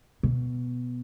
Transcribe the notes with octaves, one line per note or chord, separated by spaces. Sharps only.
B2